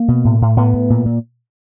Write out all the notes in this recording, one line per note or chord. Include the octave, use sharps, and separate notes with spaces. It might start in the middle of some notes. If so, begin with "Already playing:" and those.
Already playing: A#3
B2
A2
A2
A2 B3
A2
A#2
A#2